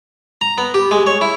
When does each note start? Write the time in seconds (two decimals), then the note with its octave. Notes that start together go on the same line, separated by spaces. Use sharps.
0.41 A#5
0.58 B3
0.74 G4
0.91 G#3
1.07 C#5
1.21 E4